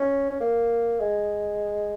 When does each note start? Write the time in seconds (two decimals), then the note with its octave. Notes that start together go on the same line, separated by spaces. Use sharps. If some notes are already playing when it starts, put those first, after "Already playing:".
Already playing: C#4
0.30 C#4
0.41 A#3
1.00 G#3